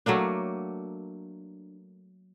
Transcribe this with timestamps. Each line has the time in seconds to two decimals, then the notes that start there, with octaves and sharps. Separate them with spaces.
0.06 F#3 A3 A#3 D4